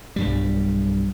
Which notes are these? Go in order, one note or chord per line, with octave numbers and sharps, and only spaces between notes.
B1 G2 G3